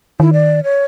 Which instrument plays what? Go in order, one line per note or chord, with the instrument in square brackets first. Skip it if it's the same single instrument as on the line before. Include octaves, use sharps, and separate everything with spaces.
[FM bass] D#3 [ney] E4
[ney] D5
C#5